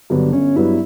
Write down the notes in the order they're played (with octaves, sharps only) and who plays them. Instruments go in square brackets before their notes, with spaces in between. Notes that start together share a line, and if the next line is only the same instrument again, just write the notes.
[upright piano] G2 F#3 B3 [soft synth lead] D3
[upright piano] G1 [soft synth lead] C#4
[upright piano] G2 F#3 B3 [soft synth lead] E4